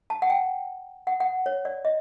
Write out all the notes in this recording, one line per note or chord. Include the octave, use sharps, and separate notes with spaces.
A5
F#5
G5
F#5
F#5
C#5
D5
D#5